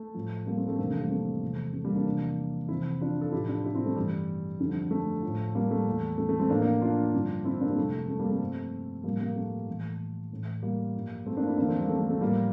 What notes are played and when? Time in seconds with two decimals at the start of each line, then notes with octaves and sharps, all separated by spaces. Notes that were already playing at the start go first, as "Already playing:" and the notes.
Already playing: A3
0.15 A2 F3
0.46 G3 A#3
0.57 A3 C4
0.67 A3 C4
0.78 F2 C3 E3 A#3 D4
0.89 A3 C4
1.00 G3 A#3
1.10 A3 C4
1.42 E2 C3 F3
1.73 A3
1.85 G3 A#3
1.91 C4
1.95 A#3 D4
2.06 E2 C3 F3
2.68 F2 C3 E3 C4 E4
3.01 D4 F4
3.21 F4 A4
3.32 A2 F3 E4 G4
3.48 D4 F4
3.64 E4 G4
3.75 C4 E4
3.86 A3
3.96 G2 E3 G3
4.59 F2 D3 F3
4.91 A3
5.22 A2 F3
5.55 G3 A#3
5.71 A3
5.86 E2 E3
6.18 A3
6.29 A3
6.39 A3 C4
6.50 A2 F3 A#3 D4
6.60 A#3 D4
6.82 D4 F4
7.13 G2 D3 F3
7.45 C4 E4
7.61 A#3 D4
7.69 G3
7.77 F2 C3 F3 A3
8.08 A3
8.19 G3 A#3
8.30 A3 C4
8.40 G2 F3
9.04 A2 F3 G3 A#3
9.20 G3 A#3
9.36 A3
9.67 A2 E3
10.31 A2 E3
10.63 G3 A#3
10.95 G2 F3
11.26 A3 C4
11.37 A#3 D4
11.48 C4 E4
11.58 E2 D3 F3 A#3 D4
11.68 A3 C4
11.79 G3 A#3
11.89 A3
12.00 A3
12.10 A3
12.21 A2 F3 G3 A#3